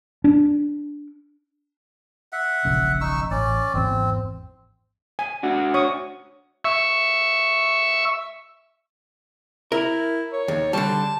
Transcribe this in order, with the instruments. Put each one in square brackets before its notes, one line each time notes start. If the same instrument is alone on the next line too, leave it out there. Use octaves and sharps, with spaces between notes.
[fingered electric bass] D4
[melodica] E5 F#5
[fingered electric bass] E1 A#1 C#3
[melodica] D#4 C#6 E6
[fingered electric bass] A1 [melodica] C#4 D5
[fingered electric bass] G#1 E2 [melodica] C4
[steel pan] G#5
[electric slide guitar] D4 F#4
[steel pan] C#5 C#6 D#6
[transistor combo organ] E5 C#6
[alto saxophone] E4 [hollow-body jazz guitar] A#4
[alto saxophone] C#5
[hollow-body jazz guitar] D#2
[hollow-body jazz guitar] D3 G3 [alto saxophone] A5